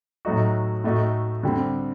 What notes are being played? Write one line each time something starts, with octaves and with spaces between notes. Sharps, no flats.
A2 F#3 A3 D#4 F#4
A2 A3 D#4 F#4
D3 G3 C4